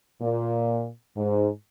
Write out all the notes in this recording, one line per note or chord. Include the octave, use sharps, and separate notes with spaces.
A#2
G#2